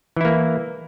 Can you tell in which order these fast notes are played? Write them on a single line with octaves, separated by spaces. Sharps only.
E3 E4 A#3